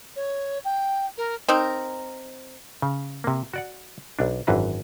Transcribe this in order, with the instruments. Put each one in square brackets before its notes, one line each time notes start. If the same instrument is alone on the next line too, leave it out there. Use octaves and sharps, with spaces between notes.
[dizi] C#5
G5
A#4
[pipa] C4 D#4 A#4
[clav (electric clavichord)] C#3
C3 A#3
F#4 D5 F#5
B1 D4
G#1 F#2 E3 B4 F5 A#5